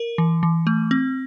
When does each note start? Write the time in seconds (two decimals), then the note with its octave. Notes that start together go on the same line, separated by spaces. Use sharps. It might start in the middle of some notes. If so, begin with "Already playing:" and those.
Already playing: A#4
0.18 E3
0.43 E3
0.67 A3
0.91 C4